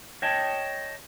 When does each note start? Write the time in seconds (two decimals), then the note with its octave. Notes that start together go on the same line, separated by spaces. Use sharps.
0.22 C#5 D#5 G5 A5